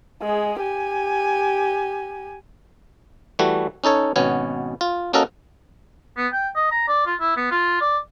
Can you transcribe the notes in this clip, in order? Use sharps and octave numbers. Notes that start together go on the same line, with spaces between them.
G#3 G#4
G4 G#5
E3 G3 A3 F#4
C#4 D#4 A4 C#5
G#1 B2 B3 C#4 C#5
F4
A#3 C#4 F#4 A4 A#4 D#5
B3
G5
D#5
A#5
D5
F4
E4
B3
F4
D5